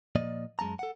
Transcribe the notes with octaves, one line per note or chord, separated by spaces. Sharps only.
A#2 F3 A#3 D5 D#5
F#2 G#3 A3 A5 A#5
A4 F#5